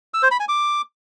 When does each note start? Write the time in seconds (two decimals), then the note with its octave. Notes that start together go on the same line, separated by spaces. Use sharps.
0.14 E6
0.23 C5
0.31 B5
0.40 G#5
0.48 D6